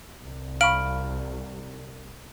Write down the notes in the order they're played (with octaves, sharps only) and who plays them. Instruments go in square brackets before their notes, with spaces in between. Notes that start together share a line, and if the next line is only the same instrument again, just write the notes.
[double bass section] C2
[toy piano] F5 B5 C#6 [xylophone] F6 D7 F#7